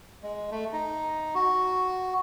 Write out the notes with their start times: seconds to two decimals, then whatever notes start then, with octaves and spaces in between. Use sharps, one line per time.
0.23 G#3
0.51 A3
0.73 D#4
1.35 F#4